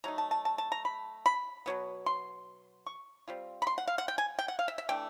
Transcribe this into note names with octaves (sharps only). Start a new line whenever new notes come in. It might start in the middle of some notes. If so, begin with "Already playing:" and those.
F#3 A3 D#4 A#5
A5
A5
A5
A5
A#5
B5
B5
B2 F#3 B3
C6
C#6
G3 C4 F4
B5
C6
F#5
F5
F#5
G5
G#5
G5
F#5
F5
E5
E5
E3 A3 D4 G5